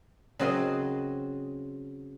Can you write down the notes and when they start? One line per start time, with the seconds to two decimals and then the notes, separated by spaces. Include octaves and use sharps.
0.39 C#3 F#3 C4 F#4 D#5 C6